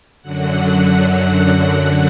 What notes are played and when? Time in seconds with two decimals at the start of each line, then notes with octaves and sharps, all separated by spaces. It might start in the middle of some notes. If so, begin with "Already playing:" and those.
0.22 F#2 D3 F#3 F#5